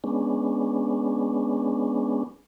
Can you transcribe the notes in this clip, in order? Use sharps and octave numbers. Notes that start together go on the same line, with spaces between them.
G#3 B3 C#4 D4